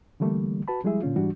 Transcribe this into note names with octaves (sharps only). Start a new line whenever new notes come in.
D3 E3 G3 A3 A#3
F#4 B4 A5 B5
F3 G3 G#3 E4 G#4 E5
A#2 D3 C#4 F4
G#2 E3 G3 D4 F#4